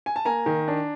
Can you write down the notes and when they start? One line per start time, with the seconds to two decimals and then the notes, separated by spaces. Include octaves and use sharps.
0.06 G#5
0.16 A5
0.25 A#3 G#5 A#5
0.46 D#3
0.68 D4